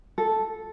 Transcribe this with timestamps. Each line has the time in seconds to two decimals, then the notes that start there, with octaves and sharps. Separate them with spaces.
0.18 A4